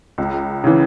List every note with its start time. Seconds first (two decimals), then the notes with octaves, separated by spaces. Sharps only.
0.18 C#2
0.64 C#3 E3